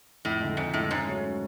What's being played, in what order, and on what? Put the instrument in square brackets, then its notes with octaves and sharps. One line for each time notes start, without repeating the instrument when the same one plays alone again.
[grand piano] F2 [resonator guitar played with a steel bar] A2
[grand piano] D3 G#3
[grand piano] F2 [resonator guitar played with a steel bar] G#2
[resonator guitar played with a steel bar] A2 [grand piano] D3 G#3
[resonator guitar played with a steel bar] G#2 [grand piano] C#3
[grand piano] F#3 A3 C#4 F#4
C#3